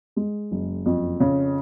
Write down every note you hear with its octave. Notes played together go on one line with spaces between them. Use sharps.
G#3
F#1
F2
C#3